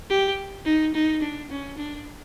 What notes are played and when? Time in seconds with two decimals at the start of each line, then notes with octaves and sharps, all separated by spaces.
0.10 G4
0.65 D#4
0.95 D#4
1.22 D4
1.50 C#4
1.78 D4